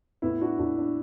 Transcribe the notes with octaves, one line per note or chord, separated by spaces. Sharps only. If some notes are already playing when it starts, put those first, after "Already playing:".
A2 B3 E4
D4 F#4
A2 D4 F#4
D4